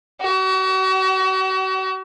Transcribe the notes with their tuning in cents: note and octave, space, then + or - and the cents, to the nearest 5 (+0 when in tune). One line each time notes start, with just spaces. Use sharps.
F#4 +40